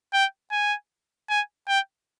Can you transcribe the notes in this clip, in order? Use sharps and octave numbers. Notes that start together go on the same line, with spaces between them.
G5
G#5
G#5
G5